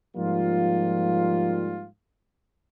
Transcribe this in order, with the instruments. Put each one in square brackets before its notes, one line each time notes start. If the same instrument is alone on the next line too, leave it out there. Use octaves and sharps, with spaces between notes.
[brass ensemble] G#2 F3 G3 A#3 F4